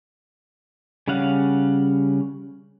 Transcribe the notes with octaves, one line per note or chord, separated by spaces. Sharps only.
C#3 G3 C#4 F5 F#5